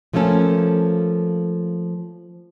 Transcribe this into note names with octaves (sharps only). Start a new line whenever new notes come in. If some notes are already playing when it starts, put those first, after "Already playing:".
F3 A3 A#3 C#4 A4